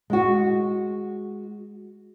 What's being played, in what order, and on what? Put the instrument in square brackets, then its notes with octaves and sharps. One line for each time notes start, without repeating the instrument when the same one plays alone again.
[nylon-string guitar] G#3 F#4